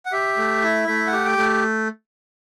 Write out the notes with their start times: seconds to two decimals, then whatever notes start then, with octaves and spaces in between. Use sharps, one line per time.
0.06 F#5
0.12 G4 E5
0.37 A3
0.63 E4
0.88 A3 E5
1.07 F#5
1.13 G4
1.26 G5
1.38 A3